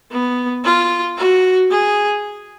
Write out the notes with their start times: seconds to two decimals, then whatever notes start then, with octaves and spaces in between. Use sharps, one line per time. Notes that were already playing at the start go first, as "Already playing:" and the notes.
0.12 B3
0.64 F4
1.18 F#4
1.71 G#4